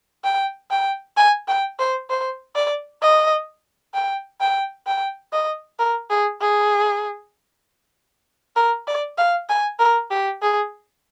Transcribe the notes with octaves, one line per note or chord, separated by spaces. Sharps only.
G5
G5
G#5
G5
C5
C5
D5
D#5
G5
G5
G5
D#5
A#4
G#4
G#4
A#4
D5
F5
G#5
A#4
G4
G#4